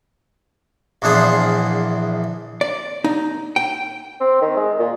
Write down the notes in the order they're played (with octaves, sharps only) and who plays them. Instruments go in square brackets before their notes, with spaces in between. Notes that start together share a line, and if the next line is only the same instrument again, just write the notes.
[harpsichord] A#1 E2 D4 G#4 C5
[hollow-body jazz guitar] D5
D#4
G5
[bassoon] C4
D#3
G#3
A#2